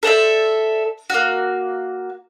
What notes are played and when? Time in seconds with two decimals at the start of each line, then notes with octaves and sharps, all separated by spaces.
0.03 A4 C5 D5 E5
1.10 A#3 F#4